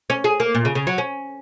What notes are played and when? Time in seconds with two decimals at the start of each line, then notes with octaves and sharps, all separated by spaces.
0.10 C#4
0.24 G#4
0.40 A#3
0.55 A#2
0.65 C#3
0.75 C#3
0.87 F#3
0.98 C#4